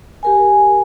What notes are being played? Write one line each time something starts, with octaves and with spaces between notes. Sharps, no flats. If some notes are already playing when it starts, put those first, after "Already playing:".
G4 A#4 G#5